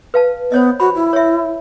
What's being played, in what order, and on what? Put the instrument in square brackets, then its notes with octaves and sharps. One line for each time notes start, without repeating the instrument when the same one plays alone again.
[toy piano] B4 F5 A5
[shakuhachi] B3 [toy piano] C5 C#5 D#5
[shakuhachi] F#4 [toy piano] B5
[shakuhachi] E4
[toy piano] C#5 E5